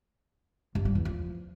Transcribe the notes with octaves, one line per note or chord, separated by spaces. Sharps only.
G2
G3
E2
F3